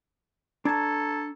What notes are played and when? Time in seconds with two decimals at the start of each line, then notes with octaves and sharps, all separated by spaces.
0.65 D4 A4 A5 A#5 C#6 G#6